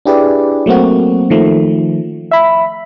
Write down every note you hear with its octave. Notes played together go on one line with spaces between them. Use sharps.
D4 E4 G4 G#4 B4 D5
F#3 A3 A#3 C4 F#4
D#3 F3 A3
E5 B5